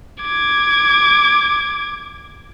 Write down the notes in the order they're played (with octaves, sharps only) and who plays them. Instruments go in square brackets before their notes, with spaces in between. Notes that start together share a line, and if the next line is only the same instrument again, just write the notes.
[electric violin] D6 G#6